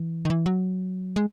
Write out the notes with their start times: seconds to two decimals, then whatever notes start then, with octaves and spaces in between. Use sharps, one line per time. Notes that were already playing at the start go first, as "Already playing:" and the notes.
Already playing: E3
0.25 D#3
0.30 E3
0.46 F#3
1.16 G#3